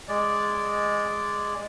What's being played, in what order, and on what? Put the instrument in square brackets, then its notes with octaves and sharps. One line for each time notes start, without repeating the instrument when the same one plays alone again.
[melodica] G#3 D5